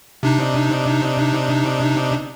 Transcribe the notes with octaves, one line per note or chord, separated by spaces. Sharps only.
C3 D4 D#4